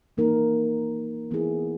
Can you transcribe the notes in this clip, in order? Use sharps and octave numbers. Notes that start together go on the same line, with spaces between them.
E3 A#3 D#4 A#4
E3 B3 E4 G#4